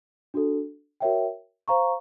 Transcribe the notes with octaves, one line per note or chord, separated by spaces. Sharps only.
D4 F#4 A4
F#4 A#4 C#5 E5 G5
C5 F5 A#5 C#6